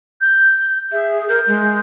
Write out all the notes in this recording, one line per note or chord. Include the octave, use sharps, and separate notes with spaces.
G6
G#4 E5
A#4 G6
G#3